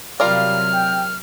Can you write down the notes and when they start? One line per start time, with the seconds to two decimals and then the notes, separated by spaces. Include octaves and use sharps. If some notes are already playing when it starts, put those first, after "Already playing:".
0.20 C3 F#3 G3 F4 A#4 D5 F5 F6
0.73 G5